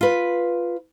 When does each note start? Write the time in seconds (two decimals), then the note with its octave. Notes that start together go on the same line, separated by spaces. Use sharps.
0.01 F4 B4